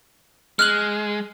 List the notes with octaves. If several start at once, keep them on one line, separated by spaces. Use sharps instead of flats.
G#3 F6 F#6 F#7